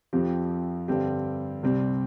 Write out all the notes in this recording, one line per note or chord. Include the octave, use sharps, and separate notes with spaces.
F2 F3 C4 G4
G2 D3 G3 C4 G4
C2 C3 G3 C4 G4